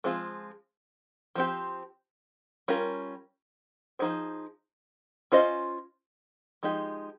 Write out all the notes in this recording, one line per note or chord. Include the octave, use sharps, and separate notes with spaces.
F3 G#3 C4 F4 G#4
F3 C4 G4
G3 C#4 F4 A#4
F3 A#3 D#4 G#4 C5
C#4 F4 C5 D#5
F3 G#3 D#4 G4